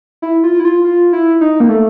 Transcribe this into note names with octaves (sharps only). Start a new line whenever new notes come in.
E4
F4
E4
F4
F4
E4
D#4
A#3
A3